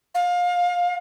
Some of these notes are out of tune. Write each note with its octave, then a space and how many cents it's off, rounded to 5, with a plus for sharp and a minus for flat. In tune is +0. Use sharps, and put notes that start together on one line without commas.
F5 +25